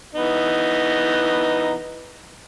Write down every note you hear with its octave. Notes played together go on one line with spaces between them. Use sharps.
E3 B3 D#4